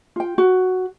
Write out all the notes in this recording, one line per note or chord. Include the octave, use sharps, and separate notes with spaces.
F4 G5
F#4